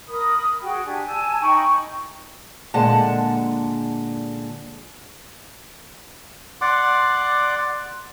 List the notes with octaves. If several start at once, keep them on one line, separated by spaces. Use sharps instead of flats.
A#4 B5 D#6
B5
F#4 G#4 G5
D4 G4 G#5
G#5 A5 E6
D#4 G5 B5 C#6
A#2 D3 G#3 F#5 A5
D5 F#5 C6 D6